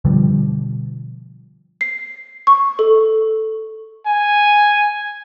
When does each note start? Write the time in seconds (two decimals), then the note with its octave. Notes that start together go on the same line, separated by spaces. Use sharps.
0.05 B2 D3 F3 G3
1.81 C7
2.47 C#6
2.79 A4
4.06 G#5